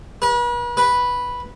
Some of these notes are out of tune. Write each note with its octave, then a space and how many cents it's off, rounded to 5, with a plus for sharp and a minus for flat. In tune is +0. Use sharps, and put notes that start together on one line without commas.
B4 -40
B4 -5